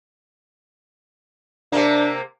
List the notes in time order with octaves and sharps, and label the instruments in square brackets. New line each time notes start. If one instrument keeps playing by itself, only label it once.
[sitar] C3 A#3 [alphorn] D4